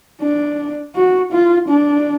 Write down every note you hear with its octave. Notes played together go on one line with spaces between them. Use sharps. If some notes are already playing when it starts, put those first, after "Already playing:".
D4
F#4
F4
D4